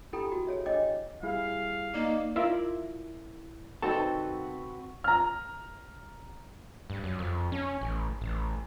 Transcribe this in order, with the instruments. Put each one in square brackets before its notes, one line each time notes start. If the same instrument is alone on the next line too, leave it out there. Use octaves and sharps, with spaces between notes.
[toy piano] D4 E4 G4 A4 G5 B5
F#4
G#4 C#5 E5
D4 C#5 D#5 G5 D6
[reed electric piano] G3 E4 G#4 [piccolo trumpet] F5
[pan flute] A#3 [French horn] D#4 [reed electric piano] D5
[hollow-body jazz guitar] E4 A#4 D5 [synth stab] F4 E5
[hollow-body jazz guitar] C2 D#4 A5 [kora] C4 A4 [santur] F#4 B4
[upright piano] A#5 F6
[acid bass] G2
F#2
F2
C#4
A1
A1